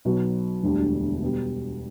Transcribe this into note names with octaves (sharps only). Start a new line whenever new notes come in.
B1 B2 F#3
E1 D2 D3 G3 D4
B2 G3